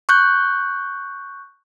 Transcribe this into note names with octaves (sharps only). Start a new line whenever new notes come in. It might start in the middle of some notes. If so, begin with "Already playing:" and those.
C#6 F#6 G6